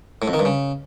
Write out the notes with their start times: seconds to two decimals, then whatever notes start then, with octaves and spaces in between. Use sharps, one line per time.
0.22 A2
0.28 F2
0.34 D#3
0.39 G2
0.45 C#3